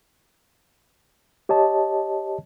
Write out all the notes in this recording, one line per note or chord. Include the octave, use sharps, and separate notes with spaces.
G4 C#5 D#5 A5